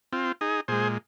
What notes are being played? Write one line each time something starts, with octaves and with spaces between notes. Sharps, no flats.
C4 F4
D#4 G#4
A#2 G#3 G#4 C5